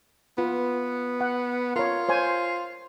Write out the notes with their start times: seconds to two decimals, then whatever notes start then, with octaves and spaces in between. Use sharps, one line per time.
0.38 B3 F4 B4
1.21 F#5
1.76 F4 A#4 C#5
2.09 C5 C#5 G#5